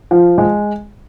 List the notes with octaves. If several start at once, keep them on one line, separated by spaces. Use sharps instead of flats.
F3
G#3